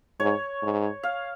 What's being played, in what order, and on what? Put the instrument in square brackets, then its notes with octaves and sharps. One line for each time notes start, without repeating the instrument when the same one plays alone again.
[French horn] G#2 [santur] C#5
[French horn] G#2
[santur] F5